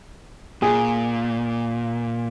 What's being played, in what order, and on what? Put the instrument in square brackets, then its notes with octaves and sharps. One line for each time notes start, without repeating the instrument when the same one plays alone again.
[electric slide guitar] A#2 [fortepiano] G#4